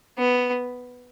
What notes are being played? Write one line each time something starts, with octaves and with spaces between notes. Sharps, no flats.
B3